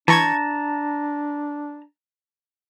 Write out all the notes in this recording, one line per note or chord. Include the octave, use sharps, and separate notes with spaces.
E3 D4 A5 A#5 C#6 G#6